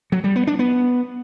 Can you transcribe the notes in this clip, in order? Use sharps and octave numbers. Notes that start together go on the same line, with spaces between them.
F#3
G3
B3
D4
B3